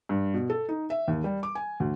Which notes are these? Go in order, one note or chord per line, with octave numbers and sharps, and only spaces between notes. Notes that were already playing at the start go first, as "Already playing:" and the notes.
G2
B2
A4
D#4
E5
D#2
G3
D6
G#5
D2